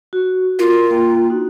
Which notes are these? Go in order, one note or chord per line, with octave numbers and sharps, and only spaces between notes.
F#4
F4 A#4
A#3 G5
D4 D#4 F#4